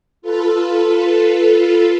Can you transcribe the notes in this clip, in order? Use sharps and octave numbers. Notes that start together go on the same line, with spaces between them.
F4 A4 B4